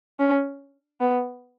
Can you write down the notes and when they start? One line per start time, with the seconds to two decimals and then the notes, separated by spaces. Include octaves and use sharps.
0.20 C#4
1.01 B3